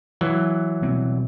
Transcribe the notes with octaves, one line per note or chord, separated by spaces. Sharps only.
E3 F#3
B2 G3 C4